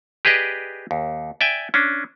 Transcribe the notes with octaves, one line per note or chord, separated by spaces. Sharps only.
G4 G#4 B4 D5 D#5
D#2
D5 E5 G5 G#5
C#4 D4